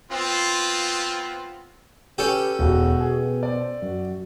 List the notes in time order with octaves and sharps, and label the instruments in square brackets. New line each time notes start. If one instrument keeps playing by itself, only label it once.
[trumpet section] B3 C4 F4
[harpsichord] C#4 A4 G5 [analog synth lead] G4 [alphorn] B4
[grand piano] E1 [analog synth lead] B2 [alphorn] F#4
[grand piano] G#4
[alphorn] C5 [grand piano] D5
[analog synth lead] F#2 [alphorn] F#4